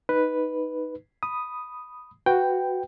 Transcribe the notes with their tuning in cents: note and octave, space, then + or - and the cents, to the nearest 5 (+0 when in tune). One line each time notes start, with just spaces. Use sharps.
D#4 +0 B4 +0
B5 +0 D#6 +0
F#4 +0 B4 +15 G5 +0